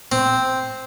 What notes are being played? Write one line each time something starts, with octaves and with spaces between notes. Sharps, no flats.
C4